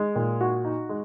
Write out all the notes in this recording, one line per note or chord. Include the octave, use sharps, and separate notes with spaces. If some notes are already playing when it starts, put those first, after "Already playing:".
Already playing: G#3
A#2
F#4
D#4
G#3